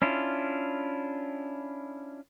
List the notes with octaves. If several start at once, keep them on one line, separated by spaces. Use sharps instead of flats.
C#4 D4 E4 F4